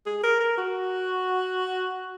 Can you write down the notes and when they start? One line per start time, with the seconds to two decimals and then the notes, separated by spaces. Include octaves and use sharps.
0.06 G#4
0.23 A#4
0.40 A#4
0.57 F#4